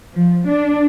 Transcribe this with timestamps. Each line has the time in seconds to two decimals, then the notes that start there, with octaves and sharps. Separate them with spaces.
0.13 F3
0.49 D4